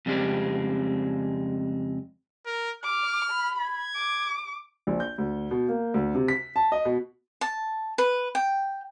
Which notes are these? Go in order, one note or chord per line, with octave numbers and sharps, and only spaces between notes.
F2 C#3 G3 G#3 C4
A#4
D6 F6
B5
G#6
D6
A#1
G6
D2
B2
A#3
D2
C3
B6
A5
D#5
B2
A5
B4
G5